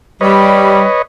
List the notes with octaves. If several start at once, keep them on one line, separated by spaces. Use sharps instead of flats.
G3 B4 C#5 D#5